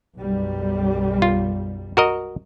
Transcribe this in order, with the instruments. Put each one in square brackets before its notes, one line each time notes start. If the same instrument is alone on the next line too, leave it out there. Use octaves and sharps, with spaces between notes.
[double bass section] B1 F#2 G3
[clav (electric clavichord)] F4
F#4 A#4 D#5